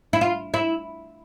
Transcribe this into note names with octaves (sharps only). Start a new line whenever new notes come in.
E4
F4
E4